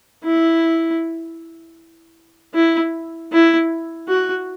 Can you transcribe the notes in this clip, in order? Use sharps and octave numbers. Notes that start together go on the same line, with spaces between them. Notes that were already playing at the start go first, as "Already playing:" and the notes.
E4
E4
E4
F#4